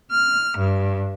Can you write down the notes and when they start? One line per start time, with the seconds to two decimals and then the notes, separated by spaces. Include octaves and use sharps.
0.11 F6
0.57 G2